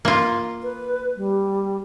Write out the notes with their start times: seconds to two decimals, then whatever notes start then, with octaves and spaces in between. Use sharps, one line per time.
0.05 A#3 F4
0.63 B4
1.16 G3